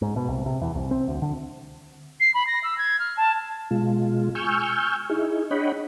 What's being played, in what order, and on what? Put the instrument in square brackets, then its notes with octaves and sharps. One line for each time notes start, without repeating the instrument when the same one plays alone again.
[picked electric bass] G#2
B2
C2
C3
E2
C2
C4
D2
D3
[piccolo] C7
B5
A#6
E6
G#6
F6
A5
[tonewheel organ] B2 G#3 F4
G#5 C#6 E6 F6 G6
D#4 E4 G#4
D4 C#5 D#5 F#5 G5 B5